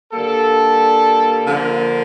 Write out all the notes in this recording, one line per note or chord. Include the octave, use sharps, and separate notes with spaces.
D3 G3 A#3 A4
D3 F3 A#3